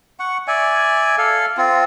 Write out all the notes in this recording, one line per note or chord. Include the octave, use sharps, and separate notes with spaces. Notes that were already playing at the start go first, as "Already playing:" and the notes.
F#5 C#6
D5 E5 G#5
A4 F5
C4 F4